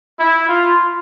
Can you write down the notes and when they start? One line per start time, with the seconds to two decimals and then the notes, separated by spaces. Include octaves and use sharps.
0.20 E4
0.48 F4